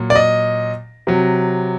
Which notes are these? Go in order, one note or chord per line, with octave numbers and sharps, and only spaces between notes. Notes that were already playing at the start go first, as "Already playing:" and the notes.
Already playing: A#2 F#3
D5
D#5
C3 F#3